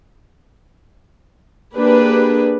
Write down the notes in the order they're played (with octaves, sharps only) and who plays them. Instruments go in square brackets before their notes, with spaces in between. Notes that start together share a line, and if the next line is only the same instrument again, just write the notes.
[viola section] A#3 D4 G4 G#4 B4